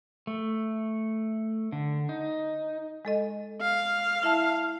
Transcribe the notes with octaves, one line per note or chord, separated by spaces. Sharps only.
A3
D3
D#4
G#3 A4 D#5
F5
E4 E5 A5